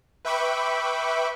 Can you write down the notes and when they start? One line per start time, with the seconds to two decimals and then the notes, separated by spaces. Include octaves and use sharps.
0.25 B4 E5 G5 B5 C#6 D6